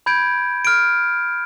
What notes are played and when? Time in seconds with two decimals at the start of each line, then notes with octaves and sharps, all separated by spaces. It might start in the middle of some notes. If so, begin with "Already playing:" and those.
0.06 B5 G6 G#6 D7
0.65 F6 D7